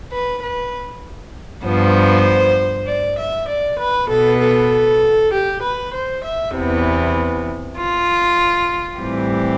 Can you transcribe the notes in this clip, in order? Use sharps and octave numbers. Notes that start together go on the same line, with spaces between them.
B4
B4
G2 F3 B3 C5
D5
E5
D5
B4
B2 B3 A4
A4
G4
B4
C5
E5
E2 C3 E3 B3
F4
A2 E3 G3 C4 G4